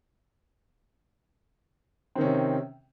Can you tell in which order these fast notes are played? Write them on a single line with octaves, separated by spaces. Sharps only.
C4 D#3 C#4 C3